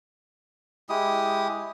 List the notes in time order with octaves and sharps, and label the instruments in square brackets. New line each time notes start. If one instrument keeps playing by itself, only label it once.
[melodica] G#3 E4 G4 D#6